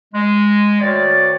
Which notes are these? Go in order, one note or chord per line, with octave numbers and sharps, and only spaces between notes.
G#3
D2 D#3 C#5 D5